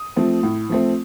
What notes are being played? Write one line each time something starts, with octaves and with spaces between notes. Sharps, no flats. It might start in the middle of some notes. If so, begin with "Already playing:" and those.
Already playing: D#6
F3 A3 C4
A2
F3 A3 C4